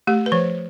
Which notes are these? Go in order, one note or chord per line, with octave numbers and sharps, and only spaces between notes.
A3 G4
B4
F3 C5